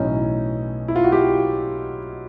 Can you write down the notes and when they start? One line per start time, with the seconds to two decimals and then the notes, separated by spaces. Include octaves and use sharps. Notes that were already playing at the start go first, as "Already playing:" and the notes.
Already playing: B1 A2 E3 C#4 D#4
0.88 E4
0.96 F4
1.04 F#4
1.12 F4 G4